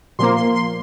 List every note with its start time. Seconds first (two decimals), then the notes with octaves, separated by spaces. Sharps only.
0.19 A#2 F3 A#3 C6
0.37 C6
0.55 C6